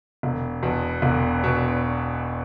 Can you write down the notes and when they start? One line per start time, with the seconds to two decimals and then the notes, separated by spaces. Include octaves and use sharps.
0.23 E1
0.63 E2 B2
1.02 E1
1.44 B2